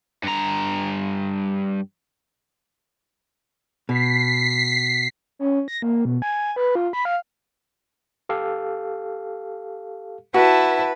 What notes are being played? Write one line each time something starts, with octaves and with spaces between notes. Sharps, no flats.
G2 A#5
B2 B6 C7
C#4
A#6
A#3
B2
G#5
B4
F4
B5
F5
G4 A4 F5
E4 F#4 B4 A5